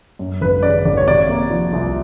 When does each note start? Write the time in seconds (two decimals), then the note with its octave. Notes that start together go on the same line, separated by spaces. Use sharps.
0.19 F#2
0.41 G#1 B4
0.63 C#3 D5
0.85 G#1 D5
0.97 C#5
1.07 C3 D5
1.29 A#3
1.50 F3
1.73 C2